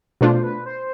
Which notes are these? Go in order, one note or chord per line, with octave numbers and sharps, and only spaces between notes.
B2 A3 D4 F4 C5
B4
C5